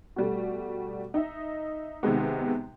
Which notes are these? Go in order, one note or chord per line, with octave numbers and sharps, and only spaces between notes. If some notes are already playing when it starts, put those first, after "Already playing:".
B2 G3 A3
D#4 D#5 E5
C3 D#3 G#3 B3